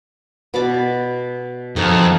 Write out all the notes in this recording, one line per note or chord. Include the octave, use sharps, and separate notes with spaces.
B2 D5 D6
F2 D#4 A4 C#6